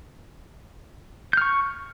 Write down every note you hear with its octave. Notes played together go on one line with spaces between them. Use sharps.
C#6 F6 G6